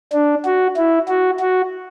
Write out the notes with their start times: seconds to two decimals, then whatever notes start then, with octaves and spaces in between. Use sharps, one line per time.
0.13 D4
0.45 F#4
0.76 E4
1.08 F#4
1.39 F#4